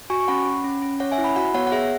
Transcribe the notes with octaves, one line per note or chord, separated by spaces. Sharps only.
F#4 G#5 C#6
C#6
C#4 F#5 B5
C#4
C#4
C#4
C#4 C#5 F#5
E5 G#5
E4
F#5 B5
F#4 F#5 B5
B3 C#5 F#5
F#5
G#4 E5